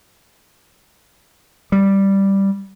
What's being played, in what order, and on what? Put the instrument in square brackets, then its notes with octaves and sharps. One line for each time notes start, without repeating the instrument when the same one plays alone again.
[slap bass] G3